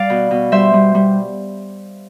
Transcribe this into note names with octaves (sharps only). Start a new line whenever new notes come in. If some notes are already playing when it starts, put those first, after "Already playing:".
Already playing: G3 D5 F5
B2
B2
G3 C5 E5
G3
G3